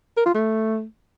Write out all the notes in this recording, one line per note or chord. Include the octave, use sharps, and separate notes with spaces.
A#4
F4
A3